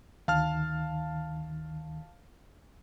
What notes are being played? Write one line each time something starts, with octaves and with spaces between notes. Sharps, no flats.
D2 D#3 F5 A5 F6